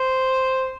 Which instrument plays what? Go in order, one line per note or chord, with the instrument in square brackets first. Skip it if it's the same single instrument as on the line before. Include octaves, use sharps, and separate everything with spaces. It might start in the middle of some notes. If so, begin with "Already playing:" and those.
Already playing: [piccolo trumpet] C5